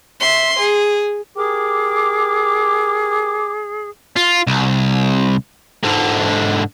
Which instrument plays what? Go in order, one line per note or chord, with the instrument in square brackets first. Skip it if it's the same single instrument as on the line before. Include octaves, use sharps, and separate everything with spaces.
[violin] E5 C6
G#4
[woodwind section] G4 A#4 D6 [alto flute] G#4
[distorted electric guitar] F4
C2
G#2 D3